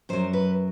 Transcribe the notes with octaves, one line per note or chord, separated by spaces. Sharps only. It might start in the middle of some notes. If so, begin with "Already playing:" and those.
F#2 F#3 C5
B4